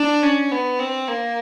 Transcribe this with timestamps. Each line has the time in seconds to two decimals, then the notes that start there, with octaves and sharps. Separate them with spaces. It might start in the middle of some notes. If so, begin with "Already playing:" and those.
Already playing: D4
0.23 C#4
0.51 B3
0.79 C4
1.08 A#3